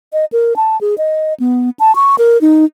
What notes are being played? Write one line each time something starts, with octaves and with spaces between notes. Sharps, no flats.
D#5
A#4
A5
G#4
D#5
B3
A5
C#6
A#4
D#4